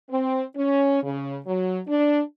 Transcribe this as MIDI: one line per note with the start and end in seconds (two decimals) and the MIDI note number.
0.11 0.44 60
0.56 1.02 61
1.03 1.37 49
1.47 1.79 54
1.88 2.21 62